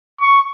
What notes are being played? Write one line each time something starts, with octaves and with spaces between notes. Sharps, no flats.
C#6